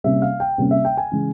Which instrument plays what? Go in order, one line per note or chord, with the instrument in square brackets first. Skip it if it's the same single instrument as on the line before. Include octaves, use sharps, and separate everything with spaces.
[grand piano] C3 G3 A#3 C#4 E5
F5
G5
C3 G3 A#3 C#4
E5
G5
G#5
C#3 E3 G#3